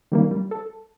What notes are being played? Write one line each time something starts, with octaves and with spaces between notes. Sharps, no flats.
D#3 G3 A#3
G3
A4